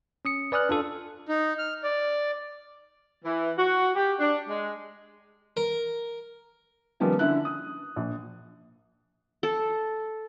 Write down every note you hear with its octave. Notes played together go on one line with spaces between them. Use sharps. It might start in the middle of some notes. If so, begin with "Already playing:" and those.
C#4 D#6 C#7
B4 D5 G#5 D#6 F6 F#6
D4 F4 A4
D#4
F6
D5
E3
F#4
G4
D4
G#3
A#4
D#3 F3 G3 A#3 B3 C#4
D3 C#4 E4 F#6
D#6
A#1
A4